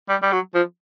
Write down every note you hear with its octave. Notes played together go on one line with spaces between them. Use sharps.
G3
G3
F#3
F3